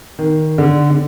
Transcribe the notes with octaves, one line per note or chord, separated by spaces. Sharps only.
D#3
D3
D3